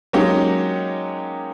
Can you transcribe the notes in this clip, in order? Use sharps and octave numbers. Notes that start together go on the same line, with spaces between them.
F#3 G#3 A#3 C#4 D#4 G4